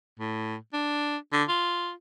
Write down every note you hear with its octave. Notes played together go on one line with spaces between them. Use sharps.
A2
D4
D3
F4